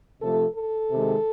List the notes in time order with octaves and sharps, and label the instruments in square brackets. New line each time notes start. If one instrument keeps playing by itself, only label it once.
[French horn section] C3 F3 A3 A4
A4
C3 D#3 G#3